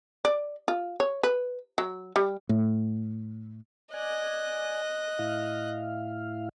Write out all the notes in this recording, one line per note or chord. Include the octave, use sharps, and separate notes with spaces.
D5
F4
C#5
B4
F#3
G3
A2
D5 D#5 G#5 F#6
A2 E4 F5